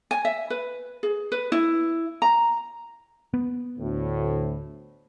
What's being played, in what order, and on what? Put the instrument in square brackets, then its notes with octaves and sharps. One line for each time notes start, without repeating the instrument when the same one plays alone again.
[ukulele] G#5
E5
B4
G#4
B4
E4
A#5
[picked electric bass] B3
[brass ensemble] D2 A2